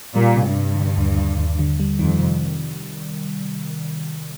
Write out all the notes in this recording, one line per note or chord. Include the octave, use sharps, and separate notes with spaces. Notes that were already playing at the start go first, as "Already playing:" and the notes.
A#2 G3
C3
G2
C3
D3
D#2
D#2
D#2
D3
G3
F2 D#3
C3